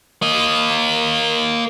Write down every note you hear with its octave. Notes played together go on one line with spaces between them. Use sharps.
A#3 D#5